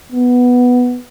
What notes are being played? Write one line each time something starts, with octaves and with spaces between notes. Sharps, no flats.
B3